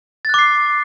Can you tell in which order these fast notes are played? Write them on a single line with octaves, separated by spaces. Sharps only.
A6 F#6 D6 C7